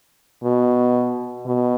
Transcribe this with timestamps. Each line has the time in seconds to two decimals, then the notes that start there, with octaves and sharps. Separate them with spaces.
0.44 B2
1.47 B2